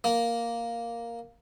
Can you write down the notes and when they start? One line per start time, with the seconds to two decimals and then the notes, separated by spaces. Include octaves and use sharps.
0.04 A#3